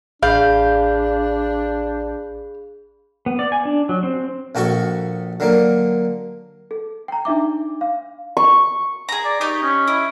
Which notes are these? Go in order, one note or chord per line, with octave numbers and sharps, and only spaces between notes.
A1 D4 G#4 F5 B5 G6
B3
D5
G#5
D4
F#3
C4
A#1 F#4 A4 C#6
D3 F#3 A#3
A4
G5 A#5
D4 D#4 E5 D6
F5
C#6
G#4 A#5
D5
D#4 G4 C#5 D#5
C#4
E4